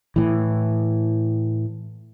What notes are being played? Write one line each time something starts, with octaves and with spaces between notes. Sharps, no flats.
A2 E3